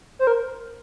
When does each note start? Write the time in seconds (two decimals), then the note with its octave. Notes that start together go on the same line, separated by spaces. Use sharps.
0.19 C5
0.27 A#4